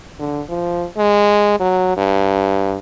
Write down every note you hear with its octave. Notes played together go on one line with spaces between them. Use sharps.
D3
F3
G#3
F#3
G2